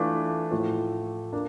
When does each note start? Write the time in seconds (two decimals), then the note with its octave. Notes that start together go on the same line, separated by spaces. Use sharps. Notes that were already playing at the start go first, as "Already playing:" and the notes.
Already playing: E3 A3 D4 F4
0.51 A2 F3 A3
1.33 A#3 D4